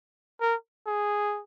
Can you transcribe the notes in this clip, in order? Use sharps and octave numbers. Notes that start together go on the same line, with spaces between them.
A#4
G#4